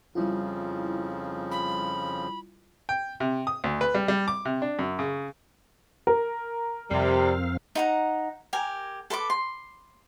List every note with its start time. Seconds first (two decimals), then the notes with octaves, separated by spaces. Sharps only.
0.15 F2 C#3 F3 G3 E4 F4
1.51 B5
2.89 G5
3.20 C3
3.47 D#6
3.64 D2
3.81 B4
3.95 G3
4.08 G3
4.28 D6
4.45 C3
4.62 D4
4.79 F#2
4.99 C#3
6.07 A#4
6.91 F2 C3 G3 C4 F5
7.75 D#4 F#5 A#5
8.53 G4 A#4 G#5
9.10 A4 B4 C6 D6
9.30 C6